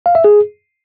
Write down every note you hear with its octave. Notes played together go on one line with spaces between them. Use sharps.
F5
E5
G#4